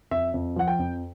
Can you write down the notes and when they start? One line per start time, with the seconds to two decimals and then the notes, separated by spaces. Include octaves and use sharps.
0.11 F2 E5
0.34 F2
0.56 F3 F#5
0.68 G5
0.79 F2